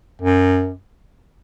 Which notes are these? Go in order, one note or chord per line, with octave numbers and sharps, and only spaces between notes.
F#2